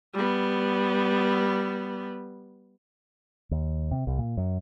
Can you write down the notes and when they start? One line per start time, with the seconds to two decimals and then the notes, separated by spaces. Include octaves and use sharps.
0.14 G3 B3
3.51 D#2
3.91 C3
4.07 C2
4.18 A#2
4.37 F#2